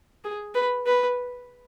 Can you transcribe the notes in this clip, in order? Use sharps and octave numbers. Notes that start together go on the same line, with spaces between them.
G#4
B4
B4